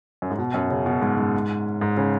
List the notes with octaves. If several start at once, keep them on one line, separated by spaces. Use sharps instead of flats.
F#2
G#2
B2
F#2
C#3
B2
G#2
G#2
G#2
C#3